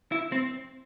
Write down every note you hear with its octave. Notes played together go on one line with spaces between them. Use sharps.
E4
C4